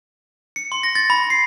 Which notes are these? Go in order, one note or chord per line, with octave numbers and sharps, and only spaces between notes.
C#7
C6
A#6
A6
B5
C7